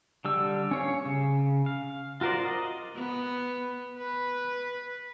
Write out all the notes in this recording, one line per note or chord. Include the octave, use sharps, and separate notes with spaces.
D3 G3 E6
C#4 C#5 F5
C#3
F5
F4 F#4 A#4 C5 D5
D#5
B3
B4